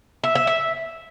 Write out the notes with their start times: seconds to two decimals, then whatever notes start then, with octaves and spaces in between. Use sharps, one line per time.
0.24 E5
0.35 E5
0.47 E5